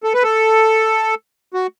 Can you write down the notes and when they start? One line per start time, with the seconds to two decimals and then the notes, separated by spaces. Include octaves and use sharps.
0.03 A4
0.14 B4
0.23 A4
1.54 F#4